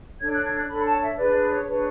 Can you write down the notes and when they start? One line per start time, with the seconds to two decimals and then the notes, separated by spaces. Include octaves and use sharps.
0.21 D4 A4 C#5 G#6
0.32 F#6
0.45 G#6
0.57 F#6
0.69 D4 A4 C#5 B5
0.85 A5
1.01 E5
1.17 D4 G#4 B4 D5
1.34 D5
1.50 C#5
1.66 D4 G#4 B4 C#5